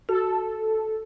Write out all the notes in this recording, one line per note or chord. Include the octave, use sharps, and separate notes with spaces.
F#4 A4